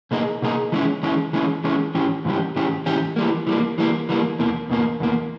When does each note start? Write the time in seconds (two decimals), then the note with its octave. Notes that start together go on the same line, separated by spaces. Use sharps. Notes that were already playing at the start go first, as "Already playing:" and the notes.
0.11 B2 A#3 D#4 G#4
0.42 B2 A#3 D#4 G#4
0.72 E3 G#3 C#4
1.03 E3 G#3 C#4
1.33 E3 G#3 C#4
1.64 E3 G#3 C#4
1.95 G#2 E3 C#4 G4
2.25 G#2 E3 G3 C#4 G4
2.56 G#2 E3 C#4 G4
2.86 G#2 E3 C#4 G4
3.16 E3 G3 A#3
3.47 E3 G3 A#3
3.78 E3 G3 A#3
4.09 E3 G3 A#3
4.39 E2 B2 A#3
4.70 E2 B2 A#3
5.00 E2 B2 A#3